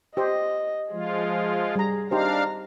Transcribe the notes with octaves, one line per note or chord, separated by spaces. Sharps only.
G4 C5 D#5
F3 G#3 F4 G#4
G3 A#5
D4 D#4 G4 C5 F5 A#5